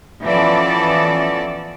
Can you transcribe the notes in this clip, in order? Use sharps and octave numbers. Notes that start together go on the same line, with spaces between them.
E3 F3 B3 C#4 A4 D5